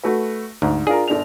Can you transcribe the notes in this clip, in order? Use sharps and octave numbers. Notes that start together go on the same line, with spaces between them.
A3 F#4 B4
D2 G#2
D4 F4 G#4 A#4
G1 D4 F7